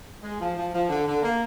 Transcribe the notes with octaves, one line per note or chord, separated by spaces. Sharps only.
G#3
F3
F3
F3
D3
D3
A#3